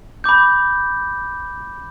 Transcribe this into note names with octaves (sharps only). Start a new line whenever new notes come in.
B5 D6 G6